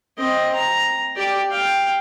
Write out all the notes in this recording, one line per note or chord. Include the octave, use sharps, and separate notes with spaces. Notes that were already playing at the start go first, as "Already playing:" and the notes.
C4 D#5
A#5
G4 D5
F5 G5